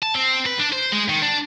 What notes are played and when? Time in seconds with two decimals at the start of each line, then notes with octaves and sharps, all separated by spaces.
0.03 A5
0.15 C4
0.46 B4
0.59 D4
0.73 C5
0.93 G#3
1.09 D#3
1.23 D4